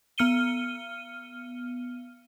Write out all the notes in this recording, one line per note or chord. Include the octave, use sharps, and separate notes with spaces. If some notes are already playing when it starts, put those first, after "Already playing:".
B3 F6 C#7 D#7 G7